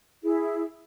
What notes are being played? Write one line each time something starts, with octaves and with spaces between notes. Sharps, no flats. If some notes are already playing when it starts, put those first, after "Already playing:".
E4 G#4